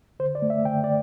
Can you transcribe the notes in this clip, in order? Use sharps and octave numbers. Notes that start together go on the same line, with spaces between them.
D3 C5
D5
A3
E5
D3 G5
D5